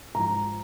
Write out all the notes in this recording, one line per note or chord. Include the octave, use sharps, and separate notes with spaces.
G#2 F3 A#5